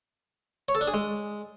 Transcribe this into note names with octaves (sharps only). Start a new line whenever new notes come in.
C#5
A4
D4
G#4
G#3